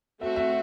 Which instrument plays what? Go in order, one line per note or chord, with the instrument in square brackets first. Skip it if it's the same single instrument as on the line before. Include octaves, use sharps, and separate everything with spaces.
[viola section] A3 C4 F#4 [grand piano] E5
[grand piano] E5